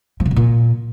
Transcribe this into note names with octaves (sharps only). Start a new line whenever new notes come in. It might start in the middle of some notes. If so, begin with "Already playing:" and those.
F3
C#3
B2
A#2